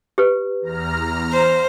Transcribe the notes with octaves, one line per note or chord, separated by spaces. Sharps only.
G4 B4
E2 A#5 F6
C5